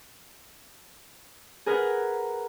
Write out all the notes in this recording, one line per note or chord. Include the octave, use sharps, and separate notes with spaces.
G#4 A#4 B4 F#5 A#5